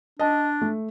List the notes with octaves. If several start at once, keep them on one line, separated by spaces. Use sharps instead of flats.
D4 D#5 A5
A3